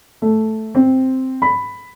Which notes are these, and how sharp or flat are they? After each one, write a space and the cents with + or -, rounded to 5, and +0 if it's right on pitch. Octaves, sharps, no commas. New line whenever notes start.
A3 -5
C4 +0
B5 +5